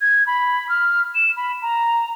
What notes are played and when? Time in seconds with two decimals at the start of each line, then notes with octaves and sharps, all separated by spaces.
0.01 G#6
0.27 B5
0.69 F6
1.15 E7
1.37 B5
1.62 A#5